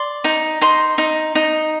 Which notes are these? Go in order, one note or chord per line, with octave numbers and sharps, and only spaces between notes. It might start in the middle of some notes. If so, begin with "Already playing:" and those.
Already playing: D5 C6
D#4
D#4 C6
D#4
D#4